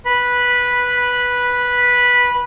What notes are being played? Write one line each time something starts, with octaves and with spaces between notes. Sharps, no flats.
B4 B5